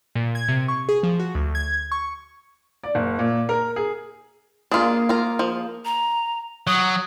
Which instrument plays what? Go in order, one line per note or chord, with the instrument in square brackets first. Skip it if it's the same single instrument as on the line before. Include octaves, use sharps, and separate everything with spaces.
[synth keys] A#2
G#6
C3
C#6
G#4
F3
F#4
D2
G#6
C#6
[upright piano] D5
F#1
A#2
A#4
G#4
[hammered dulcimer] A#3 G#4 [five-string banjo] D4 F4
[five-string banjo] F4 A#4
F3
[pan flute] A#5
[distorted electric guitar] F#3 [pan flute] D#6